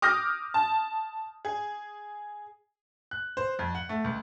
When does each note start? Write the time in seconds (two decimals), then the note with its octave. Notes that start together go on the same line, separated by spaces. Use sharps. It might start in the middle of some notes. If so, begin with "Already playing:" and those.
0.02 D6 D#6 F6 G6 A#6
0.54 A5
1.45 G#4
3.11 F#6
3.37 C5
3.59 F2
3.75 F#5
3.89 A3
4.04 C#2